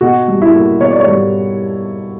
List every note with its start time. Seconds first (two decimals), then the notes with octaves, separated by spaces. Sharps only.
0.01 B2 F#4
0.28 G3
0.42 E4
0.55 A#3
0.80 B2 C#5
0.91 D5
1.00 C#5
1.07 G3